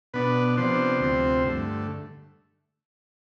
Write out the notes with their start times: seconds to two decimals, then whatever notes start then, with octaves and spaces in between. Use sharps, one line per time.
0.14 B2 B3 D4 B4
0.57 C3 F3 B3 D4 C5
1.01 D2 C3 F3 C4
1.44 G2 D3 A3